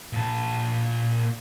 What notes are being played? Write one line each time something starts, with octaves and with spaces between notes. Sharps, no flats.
A#2 A5